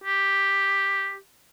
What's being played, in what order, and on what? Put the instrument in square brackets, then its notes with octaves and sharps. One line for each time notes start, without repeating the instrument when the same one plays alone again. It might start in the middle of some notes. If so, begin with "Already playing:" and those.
[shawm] G4